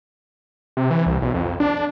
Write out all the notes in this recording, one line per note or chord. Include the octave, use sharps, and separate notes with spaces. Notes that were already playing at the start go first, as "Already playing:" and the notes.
C3
E3
C2
B1
F2
D4